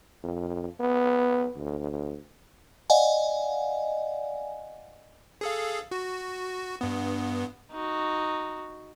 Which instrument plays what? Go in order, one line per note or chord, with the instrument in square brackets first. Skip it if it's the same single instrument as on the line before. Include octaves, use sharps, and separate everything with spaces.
[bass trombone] F2
B3
D2
[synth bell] D5 D#5 F5 F#5 G#5
[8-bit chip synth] G#4 A4 F5
F#4
G2 B3
[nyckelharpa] D#4 F#4